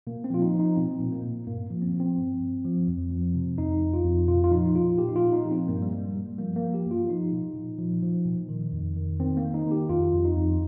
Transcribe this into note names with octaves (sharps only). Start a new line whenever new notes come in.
A#2 A#3
C4
F3 F4
D#4
F3
D#4
A#2 C4
A#2
A#3
A#2
G2 A#3
F3
C4
F3
C4
G2
G2
F3
F2
F3
C3
F2 D#4
F2
F4
F2
A#2 F4
F4
F3 D#4
A#2 F4
A#2 G4
D#4
F4
A#2
D#4
F3
C4
G2 A#3
G3
G2 A#3
G2 G3
F3 A#3
A#3
F3
G4
G2
F4
F3 D#4
A#2
A#2
F3
F3
A#2
D#3
F2
D#3
D#3 C4
A#3
D#3
D#4
D#3
G4
F2 F4
F2
D#4
F2